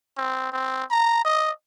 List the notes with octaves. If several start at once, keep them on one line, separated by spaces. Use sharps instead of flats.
C4
C4
A#5
D#5